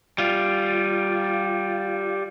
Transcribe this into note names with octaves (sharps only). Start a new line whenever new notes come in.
G3 F4